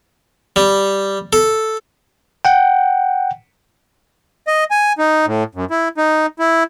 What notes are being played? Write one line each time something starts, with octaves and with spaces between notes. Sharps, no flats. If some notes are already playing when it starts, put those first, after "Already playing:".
G3
A4
F#5 G5
D#5
G#5
D#4
A2
F#2
E4
D#4
E4